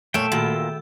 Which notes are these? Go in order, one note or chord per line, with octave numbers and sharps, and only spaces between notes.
A#2 A3 C#5 E5 G5
A#2 D#3 F#4 E6